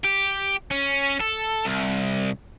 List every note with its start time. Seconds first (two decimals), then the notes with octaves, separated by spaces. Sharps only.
0.04 G4
0.71 C#4
1.21 A4
1.66 C2